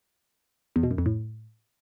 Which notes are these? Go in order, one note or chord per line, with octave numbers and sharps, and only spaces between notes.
E2
B2
F#2
F2
A2